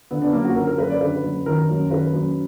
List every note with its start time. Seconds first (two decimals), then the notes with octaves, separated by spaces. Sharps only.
0.11 D3 B3
0.22 D4
0.33 F#2 A#3
0.44 F#4
0.56 D3 A#4
0.67 A#4
0.78 F#2 B4
0.90 D5
1.01 D3 B4
1.23 F#2
1.46 D#3 A#4
1.69 F#2
1.91 D#3 B4
2.14 F#2